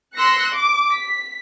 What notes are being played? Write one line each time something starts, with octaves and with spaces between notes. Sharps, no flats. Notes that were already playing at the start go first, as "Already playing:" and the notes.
C6 E6 F#6 A#6 C#7
D6
B6